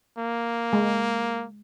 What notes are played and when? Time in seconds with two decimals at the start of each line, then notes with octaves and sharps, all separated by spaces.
0.18 A#3
0.73 G#3